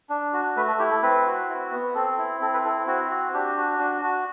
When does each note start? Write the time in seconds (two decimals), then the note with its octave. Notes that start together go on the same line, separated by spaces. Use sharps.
0.09 D4
0.33 F#4
0.57 A3 B4
0.68 A4
0.79 E4 G4
0.91 A4
1.03 C4 B4
1.26 F#4
1.48 E4
1.72 B3
1.95 C4 A4
2.18 E4
2.41 C4 A4
2.53 B4
2.65 E4 A4
2.87 C4 F#4
3.10 F#4
3.34 D4 G4
3.57 F#4
3.80 D4
4.03 F#4